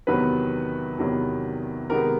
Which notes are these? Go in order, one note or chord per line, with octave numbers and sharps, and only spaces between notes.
E2 C3 D#3 F#3 B3 B4
E2 C3 D#3 F#3 B3
C3 D#3 G#3 B3 A#4